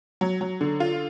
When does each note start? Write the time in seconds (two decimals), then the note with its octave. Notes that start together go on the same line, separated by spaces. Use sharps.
0.21 F#3
0.41 F#3
0.61 D3
0.80 F4